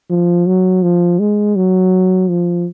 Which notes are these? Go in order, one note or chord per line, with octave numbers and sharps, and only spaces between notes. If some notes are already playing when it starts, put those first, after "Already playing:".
F3
F#3
F3
G#3
F#3
F3